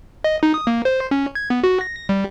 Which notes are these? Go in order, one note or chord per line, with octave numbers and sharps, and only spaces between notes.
D#5
D#4
D#6
A#3
C5
C#4
G#6
B3
F#4
A#6
G3